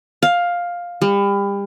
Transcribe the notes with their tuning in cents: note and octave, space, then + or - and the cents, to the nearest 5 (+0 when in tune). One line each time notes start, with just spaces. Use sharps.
F5 +10
G3 +35